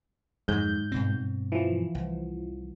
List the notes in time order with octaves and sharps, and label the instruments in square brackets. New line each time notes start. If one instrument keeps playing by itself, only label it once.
[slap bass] F2 D#3 F#3 [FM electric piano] G#2 G6
[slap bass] G2 B2 C4
[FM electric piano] E3 F3
[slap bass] C2